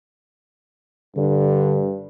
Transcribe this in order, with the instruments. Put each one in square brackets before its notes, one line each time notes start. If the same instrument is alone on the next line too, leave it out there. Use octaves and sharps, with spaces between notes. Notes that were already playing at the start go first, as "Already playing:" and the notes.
[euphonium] G2 [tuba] D3